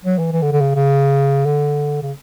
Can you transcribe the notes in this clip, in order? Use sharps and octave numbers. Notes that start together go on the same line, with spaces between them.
F#3
E3
E3
D3
D3
C#3
C#3
D3
C#3